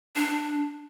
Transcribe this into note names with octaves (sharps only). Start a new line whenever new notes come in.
D4